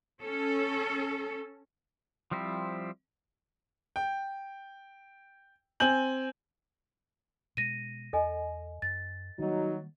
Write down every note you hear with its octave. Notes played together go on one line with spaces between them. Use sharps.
C#4 A4
F3 G3 C4 E4
G5
C4 G#5 G6 F#7
B2 G#3 A#6 D#7
E2 A4 D#5 G#5
F#2 A6
D#3 F#3 G3 A#3 D#4